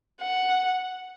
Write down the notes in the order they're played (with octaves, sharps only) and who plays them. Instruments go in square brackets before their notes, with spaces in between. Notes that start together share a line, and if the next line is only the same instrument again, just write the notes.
[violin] F#5